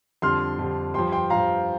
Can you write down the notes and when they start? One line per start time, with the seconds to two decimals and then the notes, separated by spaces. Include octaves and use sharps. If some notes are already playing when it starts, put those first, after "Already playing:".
0.22 F2 D3 G3 C6 F6
0.59 F2 D3 G3
0.94 G2 F3 G5 C6
1.12 G5 C6
1.30 G2 F3 F5 A#5